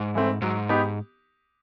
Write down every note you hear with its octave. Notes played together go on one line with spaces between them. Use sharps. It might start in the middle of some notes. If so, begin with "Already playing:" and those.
Already playing: G#2
E3 A3 C4
G#2 F#3
B3 D#4 G4